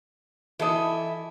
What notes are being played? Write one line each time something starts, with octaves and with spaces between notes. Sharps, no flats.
E3 E4 A4 D#5